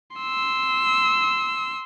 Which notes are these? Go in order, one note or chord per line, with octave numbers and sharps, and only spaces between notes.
C6 E6